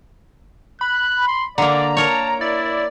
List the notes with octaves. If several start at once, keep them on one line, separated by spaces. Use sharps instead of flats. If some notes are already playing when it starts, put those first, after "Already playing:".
B5 F#6
C6
D3 A#3 D5 A#5
A#4 C#5 A5
E4 D5